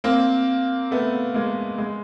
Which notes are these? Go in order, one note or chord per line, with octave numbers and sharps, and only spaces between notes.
A#3 C4
A3 B3
G#3 A#3
G#3